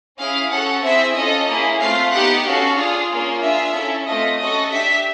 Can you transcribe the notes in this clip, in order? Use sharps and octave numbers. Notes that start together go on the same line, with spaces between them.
C#4 E4 G#4 F5
C#4 F#4 A4 F#5
C4 E4 G#4 E5
C#4 F4 A4 D#5
A#3 C#4 E4 G#4
A3 C4 F4 F5
B3 D#4 G4 F#5
C#4 F#4 A4 F5
D4 F4 G#4
A#3 C#4 F4
D4 F4 G#4 E5
C#4 E4 A4
A3 C4 F4 A4 D#5
C#4 F#4 A4 D#5
D4 G4 E5